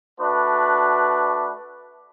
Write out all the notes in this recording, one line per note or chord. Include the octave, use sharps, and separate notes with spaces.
A3 D4 F#4 B4 D5